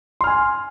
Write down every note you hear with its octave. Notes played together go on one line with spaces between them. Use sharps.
G#5 C6 F6